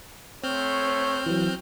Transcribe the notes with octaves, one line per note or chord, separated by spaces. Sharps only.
A3 C4 C5 C#5 F6 G6
E3 F#3